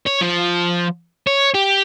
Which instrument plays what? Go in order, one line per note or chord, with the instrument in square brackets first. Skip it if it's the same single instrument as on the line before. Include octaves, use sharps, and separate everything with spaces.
[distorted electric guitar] C#5
F3
C#5
G4